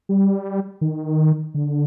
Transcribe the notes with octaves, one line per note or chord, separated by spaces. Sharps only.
G3
D#3
D3